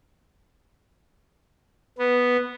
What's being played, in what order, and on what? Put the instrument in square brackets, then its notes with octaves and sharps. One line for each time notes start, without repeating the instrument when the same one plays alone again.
[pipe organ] B3